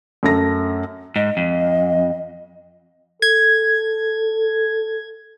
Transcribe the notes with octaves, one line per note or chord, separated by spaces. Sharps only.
F#2 A3 A#6
G#2 D#5
F2
A4 G#6